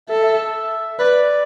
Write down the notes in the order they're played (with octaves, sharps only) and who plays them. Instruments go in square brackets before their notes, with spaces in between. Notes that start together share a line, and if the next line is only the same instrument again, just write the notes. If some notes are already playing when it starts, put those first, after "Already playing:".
[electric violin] A4 [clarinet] E5
[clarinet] E5
[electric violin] B4 [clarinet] D5